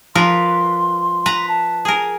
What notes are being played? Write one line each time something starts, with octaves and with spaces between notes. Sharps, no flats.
F3 A#4 B4 C6
B4 A#5
A5
G#4 A#4